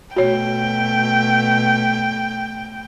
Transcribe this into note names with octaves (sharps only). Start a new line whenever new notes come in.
B2 A3 F#4 C#5 G5